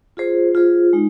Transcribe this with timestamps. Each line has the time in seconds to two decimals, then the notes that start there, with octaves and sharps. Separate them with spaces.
0.17 F4 G#4 C5
0.55 F4 G#4 C5
0.93 G#3 D#4